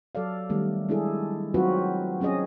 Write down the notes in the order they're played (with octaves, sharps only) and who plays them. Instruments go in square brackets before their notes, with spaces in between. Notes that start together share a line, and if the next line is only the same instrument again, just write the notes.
[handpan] F#3 A4 D5 F5
D#3 G3 A3 B3
G#3 D4 E4 G#4 A4
F#3 C4 D#4 F4 F#4 B4
F#3 C4 C#4 G#4 D#5